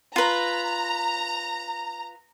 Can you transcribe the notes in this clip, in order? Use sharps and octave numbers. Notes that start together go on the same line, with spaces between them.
F4 B4 A#5